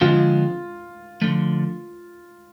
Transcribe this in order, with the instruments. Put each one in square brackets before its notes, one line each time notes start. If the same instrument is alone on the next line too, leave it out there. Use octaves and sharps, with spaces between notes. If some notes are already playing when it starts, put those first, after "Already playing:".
[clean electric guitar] D3 F3 G#3 C4 [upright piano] F4
[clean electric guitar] D3 F3 A3